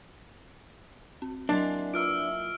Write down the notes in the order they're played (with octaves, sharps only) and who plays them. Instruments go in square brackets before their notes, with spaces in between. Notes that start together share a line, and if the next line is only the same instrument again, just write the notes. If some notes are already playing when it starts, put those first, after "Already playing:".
[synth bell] C4
[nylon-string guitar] F#3 A#3 E4 [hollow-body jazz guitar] D4 [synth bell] D#5 G#5 C6
[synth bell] F4 E5 [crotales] E6 F6 D7